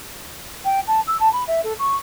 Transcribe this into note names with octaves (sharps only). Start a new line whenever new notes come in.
G5
A5
E6
A5
B5
E5
A4
C#6